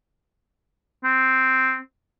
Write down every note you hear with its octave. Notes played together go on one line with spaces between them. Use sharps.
C4